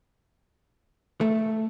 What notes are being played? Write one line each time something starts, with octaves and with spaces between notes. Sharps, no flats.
A3